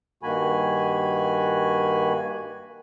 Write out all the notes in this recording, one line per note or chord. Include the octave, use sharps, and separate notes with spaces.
G2 D#3 A#3 F#4 G#5 B5